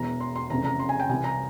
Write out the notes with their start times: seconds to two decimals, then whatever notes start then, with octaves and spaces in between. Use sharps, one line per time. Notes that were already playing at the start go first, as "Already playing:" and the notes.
Already playing: E1 E2 E3 A#5
0.21 C6
0.36 C6
0.50 F1 F2 C#3 E3 A#5
0.65 A#5
0.80 C6
0.89 G#5
1.00 G5
1.09 C2 C3 E3 G#5
1.24 A#5